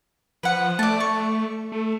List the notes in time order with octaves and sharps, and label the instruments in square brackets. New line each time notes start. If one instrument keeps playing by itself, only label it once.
[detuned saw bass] F3 [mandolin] B4 F#5
[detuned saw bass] A3 [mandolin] D5 A5
[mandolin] C#6
[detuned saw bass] A3